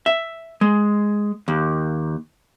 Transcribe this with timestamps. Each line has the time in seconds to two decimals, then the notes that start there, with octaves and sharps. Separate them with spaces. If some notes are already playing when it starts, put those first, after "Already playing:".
0.06 E5
0.61 G#3
1.48 D#2